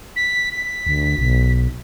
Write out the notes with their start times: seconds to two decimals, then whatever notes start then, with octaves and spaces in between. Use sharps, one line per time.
0.16 B6
0.52 B6
0.87 D2
1.18 B1